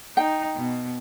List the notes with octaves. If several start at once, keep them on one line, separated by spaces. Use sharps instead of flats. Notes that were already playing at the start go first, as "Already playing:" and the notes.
D#4 G5
B2